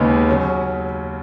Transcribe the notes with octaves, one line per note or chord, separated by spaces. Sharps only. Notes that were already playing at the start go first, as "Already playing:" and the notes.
Already playing: D#2 C#3 G#3 B3
C#3 F#3 C#4